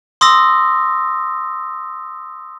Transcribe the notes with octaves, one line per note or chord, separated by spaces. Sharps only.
C6 D#6 E6 A#6